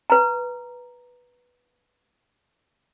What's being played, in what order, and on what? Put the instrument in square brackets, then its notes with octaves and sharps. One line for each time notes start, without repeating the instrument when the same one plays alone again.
[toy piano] B4 A#5